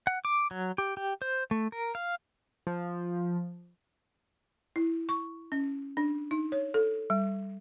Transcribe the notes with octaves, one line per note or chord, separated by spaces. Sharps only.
F#5
D6
F#3
G4
G4
C5
A3
A#4
F5
F3
E4
C#6
C#4
D4
D#4
C#5
A4
G3